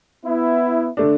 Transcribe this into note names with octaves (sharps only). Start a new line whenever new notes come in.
B3 E4
D3 A3 D4